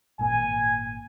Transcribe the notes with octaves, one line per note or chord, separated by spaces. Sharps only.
G#1 A#2 G#5